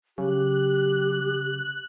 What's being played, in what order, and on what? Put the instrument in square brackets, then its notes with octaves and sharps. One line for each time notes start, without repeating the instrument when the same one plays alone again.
[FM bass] C#3 [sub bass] F#3 [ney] G4 [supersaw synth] F#6